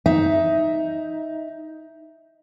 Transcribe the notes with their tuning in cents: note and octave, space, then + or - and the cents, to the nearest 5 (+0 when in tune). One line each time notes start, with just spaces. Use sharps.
D#4 +10 E5 +0